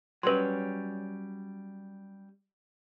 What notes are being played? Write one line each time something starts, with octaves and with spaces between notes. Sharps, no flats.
F#3 G3 C#4 B4 C6